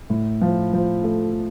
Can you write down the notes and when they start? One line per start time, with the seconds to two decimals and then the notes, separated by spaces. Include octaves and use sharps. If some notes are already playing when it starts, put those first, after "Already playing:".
0.10 A2
0.41 F3
0.73 F3
1.04 A3